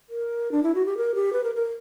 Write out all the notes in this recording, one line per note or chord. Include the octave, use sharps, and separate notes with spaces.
A#4
D4
E4
F#4
G4
A#4
G4
B4
A#4
A#4